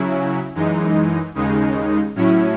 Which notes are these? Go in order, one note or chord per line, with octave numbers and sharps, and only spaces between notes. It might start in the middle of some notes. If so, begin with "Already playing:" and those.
Already playing: C#3 F#3 C#4 E4
F#2 E3 G#3 D#4
D#2 C#3 G#3 D#4
A2 F#3 C#4 E4